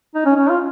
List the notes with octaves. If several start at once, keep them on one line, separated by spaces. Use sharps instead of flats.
D#4
C#4
C#4
F4